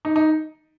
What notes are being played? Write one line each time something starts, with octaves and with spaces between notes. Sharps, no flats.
D#4
D#4